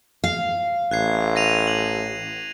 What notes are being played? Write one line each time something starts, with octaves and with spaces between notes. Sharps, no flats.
F5
A1 F#6 G#6 C7
A#6 D#7 F7
F#7